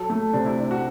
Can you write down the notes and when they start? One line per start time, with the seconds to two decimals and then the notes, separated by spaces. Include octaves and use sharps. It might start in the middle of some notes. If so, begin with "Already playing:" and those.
Already playing: F#3 A4
0.10 A3
0.33 C3 D4
0.46 E4
0.58 D4 E4
0.71 F#4